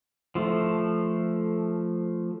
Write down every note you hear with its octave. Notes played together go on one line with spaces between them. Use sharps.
F3 A3